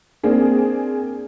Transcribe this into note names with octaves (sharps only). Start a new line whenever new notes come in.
A#3 C4 D4 G#4